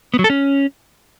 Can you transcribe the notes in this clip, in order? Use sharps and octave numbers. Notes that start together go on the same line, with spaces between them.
B3
F#3
A4
C#4